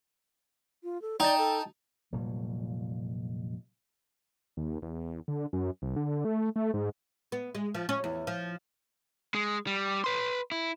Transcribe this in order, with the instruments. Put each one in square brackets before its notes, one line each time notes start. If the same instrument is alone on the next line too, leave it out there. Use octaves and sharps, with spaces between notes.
[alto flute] F4
A4
[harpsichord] D#4 [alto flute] D5 [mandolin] G5 A5
[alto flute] A4
[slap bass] F1 A#2 F#3 G3
[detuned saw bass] D#2
E2
D3
F#2
C2
D3
A3
A3
G#2
[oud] B3
G#3
F3
C#4
E2
F3
[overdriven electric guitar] G#3 G#4
G3
B4 C6
E4